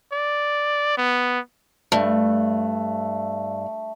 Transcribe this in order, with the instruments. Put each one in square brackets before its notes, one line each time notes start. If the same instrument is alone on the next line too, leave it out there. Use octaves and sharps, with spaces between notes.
[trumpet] D5
B3
[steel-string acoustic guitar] G2 [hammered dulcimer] A3